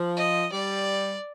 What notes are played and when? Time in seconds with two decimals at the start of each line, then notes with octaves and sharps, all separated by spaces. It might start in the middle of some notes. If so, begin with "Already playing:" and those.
Already playing: F3
0.17 D#5
0.52 G3 D5